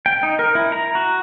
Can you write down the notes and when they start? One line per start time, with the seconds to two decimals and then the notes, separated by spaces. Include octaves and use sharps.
0.06 G5
0.23 D#4
0.39 A#4
0.55 E4
0.72 A#5
0.95 F#4